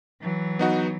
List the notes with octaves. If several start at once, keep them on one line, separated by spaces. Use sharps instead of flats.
E3 F#3
B3 D#4 F#4